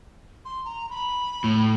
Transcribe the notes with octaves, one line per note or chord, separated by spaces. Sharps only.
C6
A#5
B5
A2